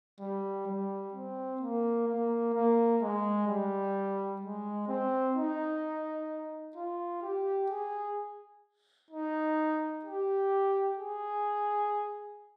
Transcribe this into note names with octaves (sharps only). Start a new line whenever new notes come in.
G3
G3
C4
A#3
A#3
A#3
G#3
G3
G#3
C4
D#4
F4
G4
G#4
D#4
G4
G#4